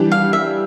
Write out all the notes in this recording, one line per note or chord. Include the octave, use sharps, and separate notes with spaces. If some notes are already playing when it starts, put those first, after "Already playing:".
Already playing: E3 G3 D4 G4
F5
E5